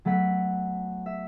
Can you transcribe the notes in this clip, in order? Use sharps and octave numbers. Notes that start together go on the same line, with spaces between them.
F#3 A3 B3 F#5 B6
E5